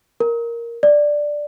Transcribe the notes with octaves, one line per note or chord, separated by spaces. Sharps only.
A#4
D5